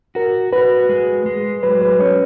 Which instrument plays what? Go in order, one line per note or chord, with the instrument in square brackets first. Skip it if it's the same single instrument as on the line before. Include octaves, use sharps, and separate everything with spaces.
[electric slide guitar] F#4 [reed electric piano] A#4
[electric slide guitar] F#4 [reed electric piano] B4
[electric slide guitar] G#3
G#3
[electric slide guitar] F#3 [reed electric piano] B4
[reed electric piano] B4
[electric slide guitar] C#4 [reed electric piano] C#5